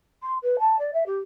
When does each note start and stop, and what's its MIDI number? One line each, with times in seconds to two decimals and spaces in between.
0.23 0.36 84
0.42 0.57 71
0.59 0.76 81
0.79 0.91 74
0.93 1.06 76
1.06 1.18 67